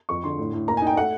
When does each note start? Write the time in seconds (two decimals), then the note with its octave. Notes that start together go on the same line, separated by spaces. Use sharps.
0.09 F2 C#6
0.24 D3 C6
0.38 A2
0.53 A2
0.68 A#3 A#5
0.77 G#5
0.82 D#4 G5
0.97 A3 F#5